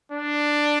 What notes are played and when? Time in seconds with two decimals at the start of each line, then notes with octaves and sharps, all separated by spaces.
0.12 D4